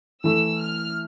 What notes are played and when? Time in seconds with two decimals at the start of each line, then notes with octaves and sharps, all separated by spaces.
0.24 E3 A3 E4 E6
0.61 F6